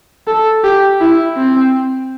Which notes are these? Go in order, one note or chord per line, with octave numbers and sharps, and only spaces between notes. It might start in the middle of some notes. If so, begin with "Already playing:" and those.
A4
G4
E4
C4